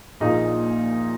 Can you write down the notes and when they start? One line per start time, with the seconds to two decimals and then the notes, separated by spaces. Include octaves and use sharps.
0.20 A#1 A#2 A#3 D#4 G#4